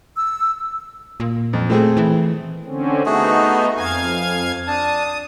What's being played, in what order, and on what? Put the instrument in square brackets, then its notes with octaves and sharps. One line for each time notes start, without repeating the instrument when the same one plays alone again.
[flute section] E6
[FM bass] A#2
[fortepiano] F2
A3 C4 G#4
[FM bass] E3
[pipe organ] D3 C4 C#4
[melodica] A3 F#4 G#4 [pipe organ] B3 D#4
[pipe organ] F2 F5 G#6 [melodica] G#5
[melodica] D4 A5 [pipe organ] D#6